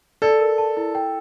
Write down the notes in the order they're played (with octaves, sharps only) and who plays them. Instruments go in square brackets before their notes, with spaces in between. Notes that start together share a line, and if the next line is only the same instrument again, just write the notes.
[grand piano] A4 [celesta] D5
[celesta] A#4
A5
E4
G5